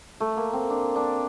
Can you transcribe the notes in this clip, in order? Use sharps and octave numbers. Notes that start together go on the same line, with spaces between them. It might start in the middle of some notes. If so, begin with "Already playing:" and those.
A3
A#3
C4
D4
D4